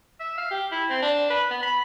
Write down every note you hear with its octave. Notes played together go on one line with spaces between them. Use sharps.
E5
F5
G4
E4
C4
D4
B4
B3
B5